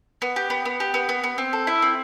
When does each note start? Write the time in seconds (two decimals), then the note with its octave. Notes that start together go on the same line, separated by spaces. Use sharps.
0.22 B3
0.36 G4
0.50 B3
0.65 B3
0.80 G4
0.94 B3
1.09 B3
1.24 B3
1.38 C4
1.53 A4
1.67 E4
1.82 C4